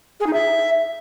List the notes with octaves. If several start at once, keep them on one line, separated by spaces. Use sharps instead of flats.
G#4
D#4
E5